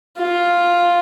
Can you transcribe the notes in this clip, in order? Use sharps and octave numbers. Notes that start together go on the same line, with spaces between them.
F4